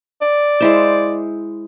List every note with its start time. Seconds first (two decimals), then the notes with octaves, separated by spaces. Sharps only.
0.21 D5
0.61 G#3 E4 C5